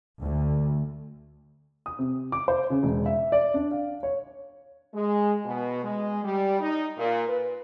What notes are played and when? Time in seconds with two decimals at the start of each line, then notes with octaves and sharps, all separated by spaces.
0.20 D2
1.86 D#6
1.99 C3
2.32 D6
2.48 C5
2.70 C#3
2.83 E1
3.06 E5
3.32 D5
3.54 D4
3.71 F5
4.03 C#5
4.94 G#3
5.45 B2
5.84 G#3
6.24 G3
6.60 D#4
6.97 A#2
7.29 B4